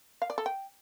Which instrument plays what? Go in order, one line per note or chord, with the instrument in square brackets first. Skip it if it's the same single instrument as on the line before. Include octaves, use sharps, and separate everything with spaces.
[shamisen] F5
D5
A4
G5